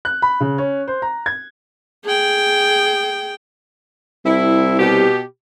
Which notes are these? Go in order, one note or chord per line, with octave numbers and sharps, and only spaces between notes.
F#6
B5
C#3
C#4
C5
A#5
G#6
G#4 G5
C2 E4
B2 G4